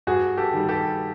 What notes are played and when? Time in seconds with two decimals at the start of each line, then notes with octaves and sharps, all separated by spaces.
0.07 G2 F#4 G#4
0.37 G4 A4
0.53 D#3 G3
0.68 G4 A4